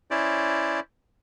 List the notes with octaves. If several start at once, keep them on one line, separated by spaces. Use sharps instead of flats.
C#4 E4 C5 D5